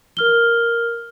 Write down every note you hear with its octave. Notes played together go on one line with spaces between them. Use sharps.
A#4 F6 G7